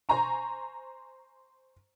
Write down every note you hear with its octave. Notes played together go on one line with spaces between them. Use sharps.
C5 G#5 A#5 C#6